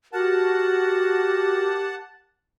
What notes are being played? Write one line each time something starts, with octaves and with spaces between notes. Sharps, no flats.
F#4 G4 A#4 F#5 A5